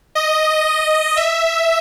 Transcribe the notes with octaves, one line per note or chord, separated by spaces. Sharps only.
D#5
E5